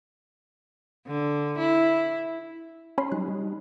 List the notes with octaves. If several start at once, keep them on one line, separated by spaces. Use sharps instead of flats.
D3
E4
C#4 C#5 B5 C6
F#3 G3 D#4 F#6
G3 D#4